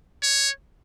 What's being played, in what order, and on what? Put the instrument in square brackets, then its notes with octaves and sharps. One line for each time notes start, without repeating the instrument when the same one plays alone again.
[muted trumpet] C#5